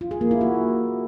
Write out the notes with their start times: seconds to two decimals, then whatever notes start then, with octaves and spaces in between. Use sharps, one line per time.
0.01 F4
0.11 G#4
0.21 A#3
0.31 E4
0.41 F#4